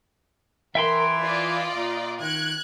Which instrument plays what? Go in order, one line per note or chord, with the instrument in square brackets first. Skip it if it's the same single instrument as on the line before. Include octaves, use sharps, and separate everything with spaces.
[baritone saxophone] E3 [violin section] A#4 [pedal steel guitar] E5 G5 C6
[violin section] F4 D5 D#5
[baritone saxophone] A#2
[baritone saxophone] D#3 [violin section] F#6 G#6